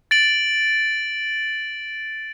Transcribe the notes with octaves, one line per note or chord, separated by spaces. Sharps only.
A6 D7 F#7